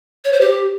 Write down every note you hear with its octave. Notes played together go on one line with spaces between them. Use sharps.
C#5
C5
G4